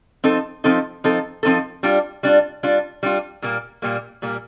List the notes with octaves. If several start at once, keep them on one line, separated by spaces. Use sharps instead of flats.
F3 C4 D#4 A4
F3 C4 D#4 A4
F3 C4 D#4 A4
F3 C4 D#4 A4
G3 D4 F4
G3 D4 F4
G3 D4 F4
G3 D4 F4
A#2 G3 A#3
A#2 G3 A#3
A#2 G3 A#3